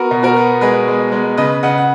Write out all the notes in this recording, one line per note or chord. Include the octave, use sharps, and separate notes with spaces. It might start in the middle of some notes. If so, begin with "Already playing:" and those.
Already playing: B3 F#4 A#4
B2
F#4 A#4
B3
G#3 G#4 B4
G#3
G#3
C#3 B4 D#5
C#3 D#5 F#5
F#5